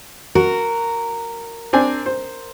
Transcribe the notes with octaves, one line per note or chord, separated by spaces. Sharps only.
F#4 A#4
C4 D4 G#5
C5